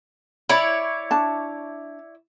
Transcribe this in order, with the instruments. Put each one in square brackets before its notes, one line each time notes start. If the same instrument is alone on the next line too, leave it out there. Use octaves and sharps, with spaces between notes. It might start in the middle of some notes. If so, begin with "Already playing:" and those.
[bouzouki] E4 C#5 D5 [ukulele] B5
[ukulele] D4 A5